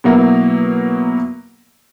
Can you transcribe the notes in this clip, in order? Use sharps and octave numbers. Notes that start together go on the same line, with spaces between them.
B2 F#3 A#3 E4 A#4